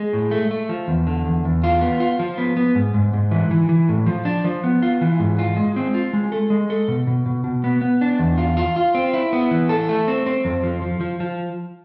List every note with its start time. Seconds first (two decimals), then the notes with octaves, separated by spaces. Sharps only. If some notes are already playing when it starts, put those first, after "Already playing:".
Already playing: G#3
0.13 A2
0.31 A3
0.51 A3
0.69 F3
0.88 E2
1.07 D3
1.26 E2
1.45 E2
1.64 F4
1.81 B3
2.00 F4
2.19 F3
2.38 B3
2.57 B3
2.75 G#2
2.94 G#2
3.14 G#2
3.31 E3
3.51 E3
3.69 E3
3.89 A2
4.07 F3
4.25 D4
4.44 F3
4.64 B3
4.83 F4
5.01 E3
5.20 G#2
5.39 F4
5.57 G#3
5.76 C4
5.94 F4
6.13 G#3
6.32 A4
6.50 G#3
6.70 A4
6.88 B2
7.07 B2
7.26 B2
7.44 B2
7.64 B3
7.81 B3
8.01 D4
8.19 E2
8.38 F4
8.57 F4
8.76 F4
8.95 C4
9.14 E4
9.33 B3
9.51 E3
9.69 A4
9.89 A3
10.08 C4
10.26 C4
10.45 F2
10.63 F3
10.82 F3
11.01 F3
11.20 F3